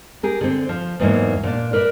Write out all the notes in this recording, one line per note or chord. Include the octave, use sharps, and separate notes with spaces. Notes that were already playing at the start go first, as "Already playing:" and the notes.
G4 G#4 A#4
D3 C4
F3
E2 G#2 E3 F#3 A#3
A#2 D4
A#4 B4 D5 E5